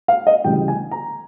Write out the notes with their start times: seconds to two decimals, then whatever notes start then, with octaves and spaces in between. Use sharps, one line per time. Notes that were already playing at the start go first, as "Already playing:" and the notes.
0.08 F5
0.27 D#5
0.44 D2 C#3 E3 G3 G5
0.68 G#5
0.91 A#5